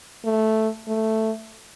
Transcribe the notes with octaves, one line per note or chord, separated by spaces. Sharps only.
A3
A3